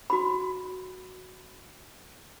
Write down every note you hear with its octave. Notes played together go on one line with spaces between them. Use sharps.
F#4 B5